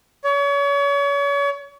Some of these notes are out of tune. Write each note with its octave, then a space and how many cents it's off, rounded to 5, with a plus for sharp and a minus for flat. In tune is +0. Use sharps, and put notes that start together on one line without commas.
C#5 +35